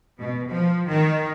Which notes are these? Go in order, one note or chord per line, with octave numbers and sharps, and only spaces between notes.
B2
F3
D#3